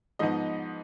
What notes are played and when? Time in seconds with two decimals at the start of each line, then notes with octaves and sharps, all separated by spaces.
0.19 G#2 F3 B3 D#4 D#5